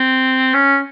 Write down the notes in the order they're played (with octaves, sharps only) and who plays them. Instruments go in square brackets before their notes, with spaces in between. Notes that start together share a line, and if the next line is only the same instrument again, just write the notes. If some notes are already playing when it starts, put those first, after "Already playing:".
Already playing: [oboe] C4
C#4